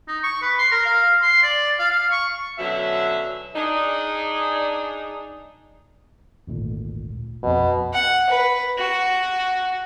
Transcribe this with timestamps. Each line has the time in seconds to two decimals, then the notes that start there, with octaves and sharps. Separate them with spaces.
0.08 D#4
0.24 C#6
0.42 B4
0.59 C6
0.71 A#4
0.85 F5
1.22 C6
1.43 D5
1.79 F5
1.91 F5
2.11 C#6
2.58 B2 D3 F#3 C#4 E5
3.54 D4 D#4 G#4
6.47 G#1 D2 A#2
7.43 A#1 F2 B2
7.93 F#5
8.30 B4
8.79 F#4